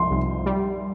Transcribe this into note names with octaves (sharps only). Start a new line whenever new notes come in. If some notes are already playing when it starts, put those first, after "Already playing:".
Already playing: C2 F3 C6
C2
G3